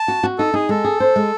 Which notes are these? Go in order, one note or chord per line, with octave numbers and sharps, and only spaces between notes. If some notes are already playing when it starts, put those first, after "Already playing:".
Already playing: A5
F#4
F#4
D#4 A4
D#4 G#4
G#3 A4
G#4
C5
G#3